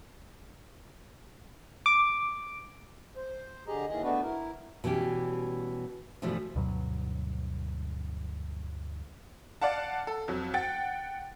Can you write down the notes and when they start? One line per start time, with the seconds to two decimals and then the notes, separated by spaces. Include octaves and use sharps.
1.86 D6
3.17 C5
3.68 D3 G4 G#4 D#5 A#5
3.89 D#2 D#3 E3 G#4 D#5
4.03 A3 B3 D4 F#4 B4
4.23 E4 A#4
4.84 B2 E3 G3 C#4 G4
6.22 G2 B2 E3 F3 G3 A3
6.55 D2 G2 B2 F#3
9.62 D5 F5 F#5 A5
10.07 A4
10.28 F2 F#3
10.54 F#5 G5 A6